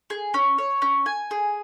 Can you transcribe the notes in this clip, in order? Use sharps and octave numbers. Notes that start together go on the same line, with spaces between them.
G#4
C#4
C#5
C#4
G#5
G#4